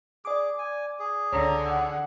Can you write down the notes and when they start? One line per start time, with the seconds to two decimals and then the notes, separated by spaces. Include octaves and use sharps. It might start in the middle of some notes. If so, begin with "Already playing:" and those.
0.25 G#4 D5 D6
0.58 G#5
0.99 G#4
1.32 C#2 D3 C#5 A#5
1.65 F#5